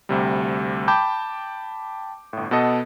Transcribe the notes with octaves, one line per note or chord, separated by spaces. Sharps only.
D2 C3 G3
G5 A5 B5 D6 G6
G1 A2
B2 B3 A4 D#5